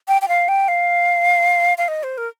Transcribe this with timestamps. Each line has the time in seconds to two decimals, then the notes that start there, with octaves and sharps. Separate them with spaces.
0.08 G5
0.22 G5
0.28 F5
0.48 G5
0.68 F5
1.78 F5
1.88 D#5
2.03 C5
2.18 A#4